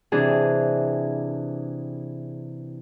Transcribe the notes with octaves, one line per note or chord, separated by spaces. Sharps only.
C3 E3 D4 G#4